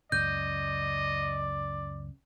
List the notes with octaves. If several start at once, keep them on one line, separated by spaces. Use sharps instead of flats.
C#2 F#2 C#3 D5 D#5 G6